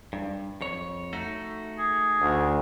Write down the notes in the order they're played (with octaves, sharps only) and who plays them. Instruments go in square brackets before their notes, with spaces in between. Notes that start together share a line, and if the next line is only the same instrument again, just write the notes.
[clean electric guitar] G2
F2 C#5
A3 D#4 F#4
[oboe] G#4
[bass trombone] D2